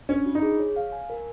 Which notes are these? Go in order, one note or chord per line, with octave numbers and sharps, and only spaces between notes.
C#4 D4
F4
D#4
G#4
C#5
F5
G#5
A#4